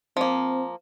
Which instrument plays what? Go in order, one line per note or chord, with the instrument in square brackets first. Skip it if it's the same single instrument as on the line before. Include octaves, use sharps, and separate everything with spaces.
[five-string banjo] F3 A#3 [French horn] C4